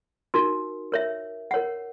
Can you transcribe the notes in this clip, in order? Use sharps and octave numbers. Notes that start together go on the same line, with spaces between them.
D#4 F#4 A#4
A#4 C#5 E5
A#4 C#5 F#5